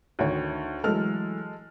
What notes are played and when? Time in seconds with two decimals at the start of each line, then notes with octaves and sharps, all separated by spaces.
0.19 D2 D#3 C#5
0.84 E3 F#3 G#3 A3 A4 F6